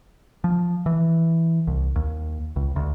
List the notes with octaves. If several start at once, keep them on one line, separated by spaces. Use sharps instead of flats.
F3
E3
C2
D#2
C#2
D2